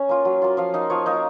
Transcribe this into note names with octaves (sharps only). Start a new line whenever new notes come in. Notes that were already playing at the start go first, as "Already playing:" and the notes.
Already playing: C#4 G#5 A#5
A#3 F4
F#3
A#3 F4
F3 F5
A#3 D#4 F5
F3 C#5
A#3 D#4